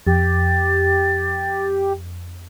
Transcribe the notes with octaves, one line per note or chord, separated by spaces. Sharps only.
F2 G4 A6